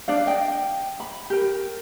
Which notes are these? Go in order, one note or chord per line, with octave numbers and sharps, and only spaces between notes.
D4 D5 F5
D#5 G5
B5
G4 A#4